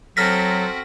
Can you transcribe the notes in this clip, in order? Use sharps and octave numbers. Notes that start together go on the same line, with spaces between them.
F#3 C4 F#4 A4 C5 F6 A#6 B6